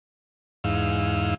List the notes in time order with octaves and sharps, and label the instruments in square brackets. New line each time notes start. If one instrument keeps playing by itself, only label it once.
[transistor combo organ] E2 G#2 D#4 F5 E6